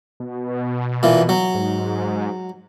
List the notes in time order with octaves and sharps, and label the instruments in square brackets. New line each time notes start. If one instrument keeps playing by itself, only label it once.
[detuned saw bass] B2
[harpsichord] A#2 E3
F#3
[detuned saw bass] G#2